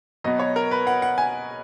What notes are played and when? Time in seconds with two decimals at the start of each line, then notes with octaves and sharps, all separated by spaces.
0.24 B2 F#3 B3 D#5
0.39 C#5
0.56 A#4
0.71 B4
0.87 F#5
1.02 F#5
1.18 G#5